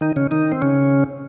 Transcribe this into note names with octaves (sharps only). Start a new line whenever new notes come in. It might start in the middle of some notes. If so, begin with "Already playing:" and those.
D#3 D#4
C#3 C#4
D#3 D#4
C4
C#3 C#4